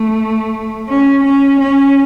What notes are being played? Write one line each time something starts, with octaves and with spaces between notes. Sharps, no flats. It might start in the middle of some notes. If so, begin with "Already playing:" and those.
Already playing: A3
C#4
C#4
C#4